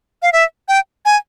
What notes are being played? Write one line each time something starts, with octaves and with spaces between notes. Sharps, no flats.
F5
E5
G5
G#5